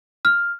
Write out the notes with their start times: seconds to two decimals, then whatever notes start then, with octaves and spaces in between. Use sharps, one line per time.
0.25 F6